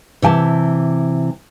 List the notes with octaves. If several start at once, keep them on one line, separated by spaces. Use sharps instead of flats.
C3 E3 G5 A5